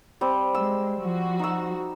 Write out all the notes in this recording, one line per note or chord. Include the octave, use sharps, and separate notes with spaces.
G3 C4
G#3 E6
F3 F#4
D#4 E6